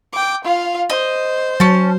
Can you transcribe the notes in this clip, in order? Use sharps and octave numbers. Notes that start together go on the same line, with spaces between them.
G5 D6
F4 F5
C5 D#5
F#3 C#4 A5